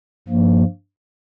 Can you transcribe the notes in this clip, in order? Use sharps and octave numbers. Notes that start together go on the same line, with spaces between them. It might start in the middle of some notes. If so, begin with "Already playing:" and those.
G2 F3 A#3